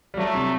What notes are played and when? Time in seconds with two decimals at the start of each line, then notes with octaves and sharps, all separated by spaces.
0.14 G3
0.17 F#3 A3
0.35 C3